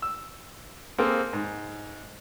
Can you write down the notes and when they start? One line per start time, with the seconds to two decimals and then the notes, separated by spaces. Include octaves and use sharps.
0.02 E6
0.98 A#3 C4 G#4 A4
1.33 G#2